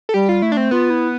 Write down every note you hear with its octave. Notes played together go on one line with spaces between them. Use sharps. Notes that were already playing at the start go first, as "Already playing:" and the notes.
A4
G3 G4
F4
A3 E4
D4
C4
B3 F4
E4